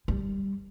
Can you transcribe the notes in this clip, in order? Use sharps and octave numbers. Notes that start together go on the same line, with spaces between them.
G3